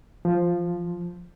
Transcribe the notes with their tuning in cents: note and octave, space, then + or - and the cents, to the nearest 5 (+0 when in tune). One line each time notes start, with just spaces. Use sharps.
F3 +0